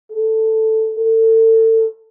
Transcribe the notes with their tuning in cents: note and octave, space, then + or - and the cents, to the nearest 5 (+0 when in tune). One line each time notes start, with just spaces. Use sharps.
A4 +5
A4 +30